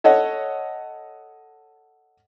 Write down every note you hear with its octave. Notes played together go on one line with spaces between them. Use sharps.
A4 C#5 D#5 F#5